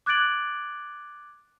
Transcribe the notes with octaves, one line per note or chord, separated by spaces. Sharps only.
D6 F#6 G#6 A6 D7 F#7